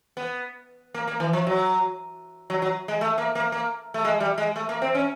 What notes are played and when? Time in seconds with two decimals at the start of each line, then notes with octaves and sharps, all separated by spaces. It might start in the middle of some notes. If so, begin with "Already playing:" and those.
0.17 B3
0.94 A#3
1.08 A#3
1.20 E3
1.33 F3
1.47 F#3
2.50 F#3
2.62 F#3
2.88 G#3
3.01 A3
3.18 A#3
3.35 A#3
3.52 A#3
3.94 A3
4.04 G#3
4.20 G3
4.38 G#3
4.56 A3
4.69 A#3
4.82 C4
4.95 C#4